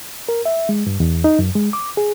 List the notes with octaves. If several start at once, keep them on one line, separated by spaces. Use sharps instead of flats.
A#4
E5
G#3
G2
E2
D#4
F#2
G#3
D6
G#4